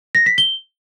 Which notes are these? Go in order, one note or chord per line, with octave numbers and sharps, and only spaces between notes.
A#6
B6
G7